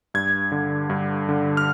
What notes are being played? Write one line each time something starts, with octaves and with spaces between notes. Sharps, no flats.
G2 G#6
D3
G2
D3
F6